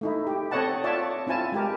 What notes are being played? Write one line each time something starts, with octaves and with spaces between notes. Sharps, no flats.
A3 D#4 E4
G4
C4 A4 C#5 D#5 F#5 A5
F4 C#5 D5 E5 A5
C4 E4 F4 G#5 A5
G#3 G4 A#4